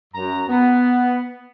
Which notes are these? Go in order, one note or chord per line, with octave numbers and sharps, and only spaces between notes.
F#2 A#5
B3